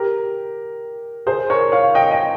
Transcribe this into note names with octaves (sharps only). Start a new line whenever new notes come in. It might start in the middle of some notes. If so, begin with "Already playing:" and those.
Already playing: G4 A#4
G#4 C5
A#4 C#5
C#5 F5
D#5 G5
D#5 G5